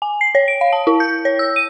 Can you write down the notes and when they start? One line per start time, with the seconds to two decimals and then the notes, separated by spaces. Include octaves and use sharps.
0.02 G#5
0.21 C7
0.35 C#5
0.48 D7
0.61 F5
0.73 A5
0.87 E4
1.00 G6
1.25 C#5
1.39 E6
1.56 D#7